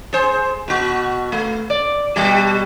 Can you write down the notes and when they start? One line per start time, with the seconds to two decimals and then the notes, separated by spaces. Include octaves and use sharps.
0.13 G#4 C5
0.68 B2 F#4
1.32 A3
1.70 D5
2.16 B2 G3 G4